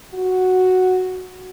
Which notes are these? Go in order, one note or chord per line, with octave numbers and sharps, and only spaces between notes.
F#4